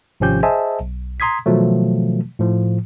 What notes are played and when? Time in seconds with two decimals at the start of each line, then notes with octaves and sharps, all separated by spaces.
0.20 G#1 C3 F3 C#4 G4 G6
0.43 G#4 C5 D#5 E5 G#5 A5
0.80 B1
1.20 A#5 C6 D#6 G#6 B6
1.46 B2 D#3 F3 F#3 A3
2.39 A2 F3